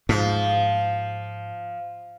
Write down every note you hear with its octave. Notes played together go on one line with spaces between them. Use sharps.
G#2 F3